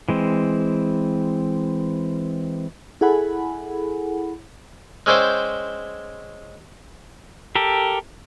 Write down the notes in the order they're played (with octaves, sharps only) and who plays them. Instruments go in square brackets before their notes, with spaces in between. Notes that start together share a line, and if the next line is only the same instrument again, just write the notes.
[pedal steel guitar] E3 G#3 C4
[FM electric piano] E4 G#4 A4 F#5 G#5 B5
[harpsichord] G#3 C#4 E4 C5 D5 G5
[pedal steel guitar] G4 A4 A#4